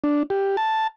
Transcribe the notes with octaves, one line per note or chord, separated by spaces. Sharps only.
D4
G4
A5